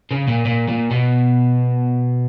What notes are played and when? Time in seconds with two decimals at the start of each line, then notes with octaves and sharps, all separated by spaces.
0.11 C#3
0.28 A#2
0.45 A#2
0.68 A#2
0.91 B2